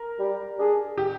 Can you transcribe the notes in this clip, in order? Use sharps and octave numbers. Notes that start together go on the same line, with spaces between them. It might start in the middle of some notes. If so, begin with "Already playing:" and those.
Already playing: A#4
G3
D4 G#4
G4